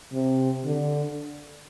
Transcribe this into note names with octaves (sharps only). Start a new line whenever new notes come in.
C3
D3